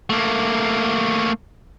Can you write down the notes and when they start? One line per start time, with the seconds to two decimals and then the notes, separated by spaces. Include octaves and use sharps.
0.10 A3 A#3